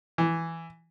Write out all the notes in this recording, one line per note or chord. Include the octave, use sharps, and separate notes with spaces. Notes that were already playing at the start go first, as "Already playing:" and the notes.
E3